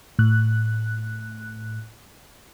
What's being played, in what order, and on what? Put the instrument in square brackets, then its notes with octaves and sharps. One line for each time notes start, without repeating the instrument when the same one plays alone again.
[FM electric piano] A2 F#6